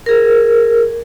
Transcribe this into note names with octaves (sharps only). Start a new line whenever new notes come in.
G#4 A#4